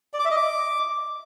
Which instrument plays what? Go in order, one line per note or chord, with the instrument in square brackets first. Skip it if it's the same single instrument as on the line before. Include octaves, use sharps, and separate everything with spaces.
[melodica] D5
D6
E5
D#5
D6